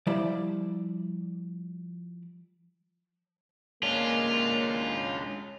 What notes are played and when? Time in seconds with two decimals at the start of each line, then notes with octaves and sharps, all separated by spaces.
0.07 F3 G3 E4 C5 D5
3.83 G#3 A#3 C#4 D4 F4